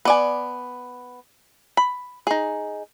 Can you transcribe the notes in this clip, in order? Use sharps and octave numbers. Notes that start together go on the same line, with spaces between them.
B3 D5 G#5
B5
D#4 G#4